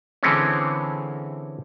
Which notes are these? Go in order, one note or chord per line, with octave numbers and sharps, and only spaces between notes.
D3 E3 G#3 C4 C#4